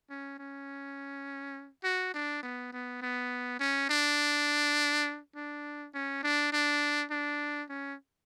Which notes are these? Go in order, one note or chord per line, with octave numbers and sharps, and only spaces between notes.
C#4
C#4
F#4
D4
B3
B3
B3
C#4
D4
D4
C#4
D4
D4
D4
C#4